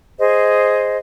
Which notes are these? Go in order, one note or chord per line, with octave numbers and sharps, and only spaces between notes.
G#4 C5 D#5